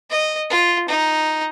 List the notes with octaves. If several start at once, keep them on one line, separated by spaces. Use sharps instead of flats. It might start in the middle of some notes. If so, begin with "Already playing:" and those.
D#5
F4
D#4